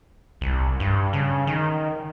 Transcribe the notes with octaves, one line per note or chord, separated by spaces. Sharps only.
C2
G2
C#3
D#3